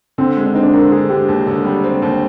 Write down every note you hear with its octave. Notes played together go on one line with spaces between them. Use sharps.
D3 C4
G#3
D4
C4 D#4
D4
D3 A#4
D3 G#4
G#3 G4
D#2
D3
G3
C4
D#2